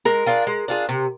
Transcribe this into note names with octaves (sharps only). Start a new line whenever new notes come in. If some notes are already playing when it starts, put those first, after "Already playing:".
G#3 A#4
D4 F4 G#4
G#3
D4 F4 G#4
C3